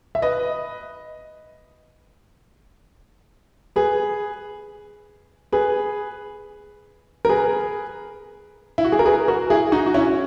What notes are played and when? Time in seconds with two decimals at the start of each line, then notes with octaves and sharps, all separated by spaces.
0.15 E5
0.22 B4 D#5
3.76 G#4 B4
5.52 G#4 B4
7.25 A#4
7.29 G#4 B4
8.78 E4
8.85 F#4
8.92 G#4
8.99 A#4
9.06 G#4 B4
9.28 F#4 A#4
9.50 E4 G#4
9.72 D#4 F#4
9.86 F#4
9.94 C#4 E4